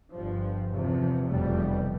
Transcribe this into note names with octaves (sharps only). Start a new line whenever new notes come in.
G1 G2 F3
E2 C3 F3
F1 E2 B2 G3